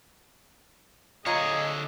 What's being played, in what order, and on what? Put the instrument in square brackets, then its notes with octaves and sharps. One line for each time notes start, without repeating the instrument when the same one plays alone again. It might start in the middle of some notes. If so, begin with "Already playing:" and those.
[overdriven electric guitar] D3 C#5 [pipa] F4 F5 A#5 [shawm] G#4 [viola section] D#5